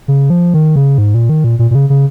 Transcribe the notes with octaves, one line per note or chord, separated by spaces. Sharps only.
C#3
F3
D#3
C#3
G#2
A#2
D#3
A#2
A#2
A#2
C#3
C#3